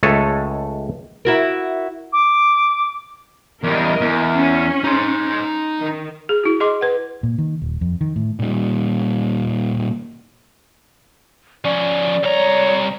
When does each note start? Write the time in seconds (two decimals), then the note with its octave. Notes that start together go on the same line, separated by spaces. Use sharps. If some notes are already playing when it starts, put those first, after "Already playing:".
0.03 C#2 G#3 A3 A4 C#5 G#5
1.25 E4 F#4 A#4
2.13 D6
3.63 E2 G3 A#4 D#5
4.01 E2
4.35 C#4
4.84 D#4 C6
5.79 D#3
6.29 G#4
6.44 E4 F#4
6.60 G#4 D#5 C6 D6
6.81 B4 F#5
7.23 A#2
7.38 D#3
7.62 D#1
7.81 F2
8.01 D#3
8.16 A2
8.39 A#2 G3
11.65 F3 C#4 D5
12.23 C2 C#5 A#5